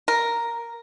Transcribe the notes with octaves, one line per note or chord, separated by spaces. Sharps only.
A#4